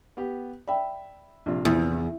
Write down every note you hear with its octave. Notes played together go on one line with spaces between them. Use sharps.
B3 G4
D5 E5 G5 B5
A#1 C3 F4
E2 E4